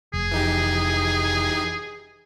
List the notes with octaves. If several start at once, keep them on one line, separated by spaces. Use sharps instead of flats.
F1 G#4
E3 D#4 G4